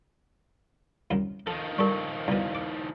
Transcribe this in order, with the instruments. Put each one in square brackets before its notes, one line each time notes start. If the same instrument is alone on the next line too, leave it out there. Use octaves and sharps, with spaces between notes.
[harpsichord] C2 F#2 D#3
[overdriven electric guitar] D#3 F3 [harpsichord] A4
[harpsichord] G3 A4 [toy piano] A#4 C#6
[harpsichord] C2 B2 [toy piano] E4 D5 F5
[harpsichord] D6